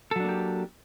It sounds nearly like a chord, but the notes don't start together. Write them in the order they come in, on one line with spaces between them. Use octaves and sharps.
A4 F#3 D4 A#3 G4